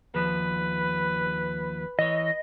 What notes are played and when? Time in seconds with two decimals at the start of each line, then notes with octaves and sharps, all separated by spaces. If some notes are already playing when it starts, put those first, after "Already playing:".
0.15 D#2 F3 B4
1.99 E3 C#5 D#5